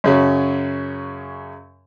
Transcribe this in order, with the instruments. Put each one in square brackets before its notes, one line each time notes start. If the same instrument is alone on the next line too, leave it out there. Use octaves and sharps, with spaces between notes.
[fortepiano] F#2 C#3 F#3